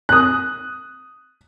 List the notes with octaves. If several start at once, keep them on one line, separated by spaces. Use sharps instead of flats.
D#6 F#6